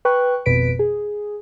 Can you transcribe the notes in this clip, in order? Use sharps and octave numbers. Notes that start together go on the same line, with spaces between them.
B4 G5 C#6 F#6
G#1 F2 B2 B4 B6 D7
G#4